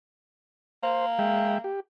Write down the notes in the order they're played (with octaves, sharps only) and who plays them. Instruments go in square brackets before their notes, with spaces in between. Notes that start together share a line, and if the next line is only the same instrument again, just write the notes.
[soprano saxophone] A#3 [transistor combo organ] C5
[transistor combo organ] G#3 E5 G5
G4